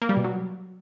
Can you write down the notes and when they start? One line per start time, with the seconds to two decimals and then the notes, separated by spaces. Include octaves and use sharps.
0.02 A#3
0.09 G3
0.17 B2
0.24 F#3